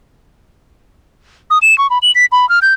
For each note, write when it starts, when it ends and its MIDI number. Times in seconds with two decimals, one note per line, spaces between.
1.50 1.58 87
1.62 1.77 100
1.78 1.87 85
1.90 1.98 83
2.02 2.11 102
2.15 2.25 95
2.32 2.48 83
2.49 2.59 89
2.62 2.74 91